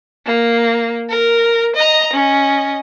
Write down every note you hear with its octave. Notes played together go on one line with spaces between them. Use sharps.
A#3
A#4
D#5 A#5
C#4 D#5